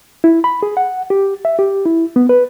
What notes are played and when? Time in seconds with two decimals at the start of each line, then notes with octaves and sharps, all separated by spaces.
0.24 E4
0.44 B5
0.63 G#4
0.77 F#5
1.10 G4
1.45 E5
1.59 G4
1.86 E4
2.16 B3
2.29 B4